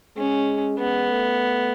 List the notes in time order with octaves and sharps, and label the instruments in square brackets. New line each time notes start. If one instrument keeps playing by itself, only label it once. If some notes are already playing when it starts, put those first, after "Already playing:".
[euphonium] G#3 [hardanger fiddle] C#4
[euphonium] G#3 [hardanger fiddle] B3
[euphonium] A3